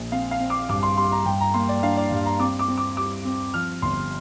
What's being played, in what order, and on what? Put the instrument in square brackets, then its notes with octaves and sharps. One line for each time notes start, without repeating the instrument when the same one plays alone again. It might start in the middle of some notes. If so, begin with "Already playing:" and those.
Already playing: [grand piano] A#1
C4 F5
F5
C4
D6
G2 D6
C6
G3 C6
A#5
G2 G5
A#5
A#3 C6
D5
D4 F5
D5
G2
A#5
C4 D6
D6
C4
D6
G3 D6
C4
F3 F6
G1 C6